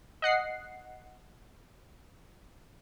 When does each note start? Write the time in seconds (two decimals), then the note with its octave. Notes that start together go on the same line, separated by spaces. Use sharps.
0.22 D#5 F#5 C7